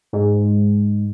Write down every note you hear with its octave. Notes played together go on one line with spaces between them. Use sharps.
G#2